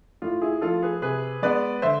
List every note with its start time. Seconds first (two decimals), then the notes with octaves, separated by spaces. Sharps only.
0.22 A2 F4
0.41 E4 G#4
0.61 F3 A3 F4 A4
0.82 G#4 B4
1.02 C3 G#4 B4
1.42 G#3 B3 B4 D5
1.82 D3 C5 E5